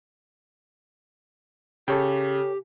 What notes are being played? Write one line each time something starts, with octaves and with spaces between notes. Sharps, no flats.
C#3 G4 A4 C#5 G5